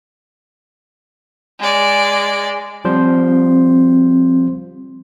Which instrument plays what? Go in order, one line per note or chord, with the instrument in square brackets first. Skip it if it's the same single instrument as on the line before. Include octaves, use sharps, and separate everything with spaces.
[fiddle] G#3 D5
[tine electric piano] F3 G3 C5 [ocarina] C4